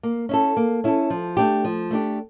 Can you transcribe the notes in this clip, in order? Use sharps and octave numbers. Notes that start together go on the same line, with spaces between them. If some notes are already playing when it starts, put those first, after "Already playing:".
A#3
C#4 E4 A4
A#3
C#4 E4 A4
F3
A3 D4 G4
F3
A3 D4 G4